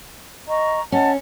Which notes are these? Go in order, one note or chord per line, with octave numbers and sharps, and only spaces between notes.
D#5 A#5 C#6
C#4 D#5 F#5 A5